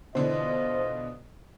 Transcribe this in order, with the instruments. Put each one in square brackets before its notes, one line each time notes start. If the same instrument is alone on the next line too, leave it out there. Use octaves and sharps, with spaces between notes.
[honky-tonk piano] B2 D3 E3 [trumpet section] F4 D#5 [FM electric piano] C5